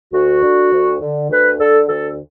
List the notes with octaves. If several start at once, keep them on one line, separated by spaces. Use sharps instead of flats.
D2 F#4
D3
D2
D3
D2 B4
D3 A4
D2 A4